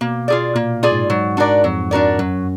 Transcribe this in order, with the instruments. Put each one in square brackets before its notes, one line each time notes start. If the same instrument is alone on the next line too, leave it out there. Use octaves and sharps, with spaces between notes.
[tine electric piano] B2 [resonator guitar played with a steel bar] A#3
[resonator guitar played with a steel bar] F4 G#4 D5
[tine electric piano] A#2 [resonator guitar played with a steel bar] A#3
[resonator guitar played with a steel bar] F4 G#4 D5
[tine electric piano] G#2
[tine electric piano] G#2 [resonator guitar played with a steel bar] F#3
[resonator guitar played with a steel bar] D4 F#4 A#4 D5
[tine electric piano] F2 [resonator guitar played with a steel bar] F#3
[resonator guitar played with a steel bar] D4 F#4 A#4 D5
[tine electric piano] F#2 [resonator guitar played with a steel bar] F#3